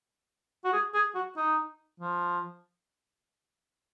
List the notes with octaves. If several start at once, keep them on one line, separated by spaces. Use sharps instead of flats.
F#4
G#4
G#4
F#4
D#4
F3